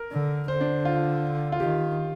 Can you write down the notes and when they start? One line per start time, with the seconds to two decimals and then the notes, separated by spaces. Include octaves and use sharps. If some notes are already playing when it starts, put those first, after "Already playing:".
Already playing: A#4
0.11 D3
0.48 D3 C5
0.61 D4
0.85 F4
1.52 F4
1.60 D#3 G4